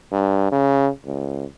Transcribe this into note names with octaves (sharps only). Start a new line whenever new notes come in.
G2
C#3
C#2